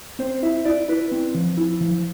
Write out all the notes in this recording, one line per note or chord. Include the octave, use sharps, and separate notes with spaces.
C4 C5
E4 E5
E4 D5
E4 B4
C4
F3
E4
F3